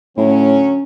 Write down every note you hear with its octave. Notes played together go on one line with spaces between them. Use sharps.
A2 D3 F#3 C#4